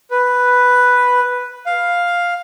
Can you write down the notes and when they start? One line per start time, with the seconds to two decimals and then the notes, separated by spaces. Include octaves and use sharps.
0.11 B4
1.66 F5